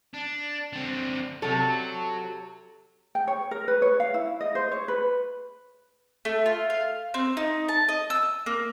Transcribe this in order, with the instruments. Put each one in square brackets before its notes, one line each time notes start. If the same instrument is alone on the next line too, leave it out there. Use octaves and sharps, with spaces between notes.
[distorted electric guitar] D4
D3 C4
[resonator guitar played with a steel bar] C3 A4 [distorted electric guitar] F#3
[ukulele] G5
C#5
A#4
B4
C#5
F5
E4
D#5
C5
C#5
B4
[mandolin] A3
F4
F5
C4
D#4
A5
D#5
E6
A#3